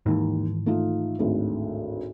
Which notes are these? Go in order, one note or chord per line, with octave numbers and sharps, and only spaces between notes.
D#2 G#2 D#3 E3
A3 D#4 F4
G#1 D2 A2